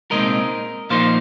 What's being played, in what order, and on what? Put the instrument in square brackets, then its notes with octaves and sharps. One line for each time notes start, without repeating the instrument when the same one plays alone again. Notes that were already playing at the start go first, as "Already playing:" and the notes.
[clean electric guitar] C2 A#2 G#3 C4 D#4 A#4 D#5
A#2 F3 A#3 D#4 C5 F5